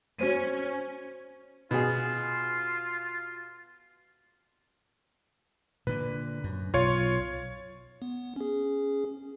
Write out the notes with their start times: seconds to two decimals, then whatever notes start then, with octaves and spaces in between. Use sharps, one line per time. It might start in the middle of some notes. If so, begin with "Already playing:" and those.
0.19 C#4 F#4 C5 D#7
1.71 B2 F4 G#4
5.87 A#2 D3 B4
6.44 F#2
6.74 B1 F4 C#5
8.02 B3
8.36 C#4 G#4